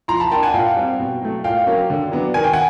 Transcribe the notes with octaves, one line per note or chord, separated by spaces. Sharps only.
F3 A#5 C6
A5 B5
A#3 D4 G5 A5
F#5 G#5
A#2 F5 G5
G3 C4
B2
F#3 A3
A#2 F5 G5
F#3 A#3 C#4
D3
F#3 B3 D4
D#3 G#5
G5
F#5 G#5